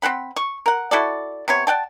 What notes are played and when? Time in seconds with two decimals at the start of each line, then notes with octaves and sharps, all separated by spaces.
0.02 C4 G4 F#5 B5
0.36 C#6
0.66 A#4 F#5
0.91 E4 F#4 A4 D5
1.48 C3 B3 C#5
1.67 D5 F#5 G5 A5